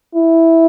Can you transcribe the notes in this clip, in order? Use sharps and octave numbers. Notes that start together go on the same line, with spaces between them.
E4